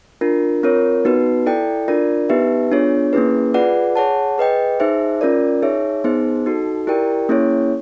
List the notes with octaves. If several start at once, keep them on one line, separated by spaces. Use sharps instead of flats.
D4 F4 A#4
C4 F4 A#4 C#5
B3 D#4 F#4 B4
E4 A4 D5 G5
D4 F4 A#4 D5
B3 D#4 G4 B4 E5
B3 D4 F4 G#4 C#5
A#3 C#4 E4 G#4 B4
F4 G#4 B4 D5 F#5
G#4 C#5 F#5 A5
G#4 B4 D#5 G5
D#4 G#4 C5 E5
C#4 F4 A#4 D5
D#4 G#4 C#5 E5
B3 D#4 G#4 C5
D#4 F#4 A4
E4 G4 A#4 D5 G5
A#3 C#4 E4 G#4 C#5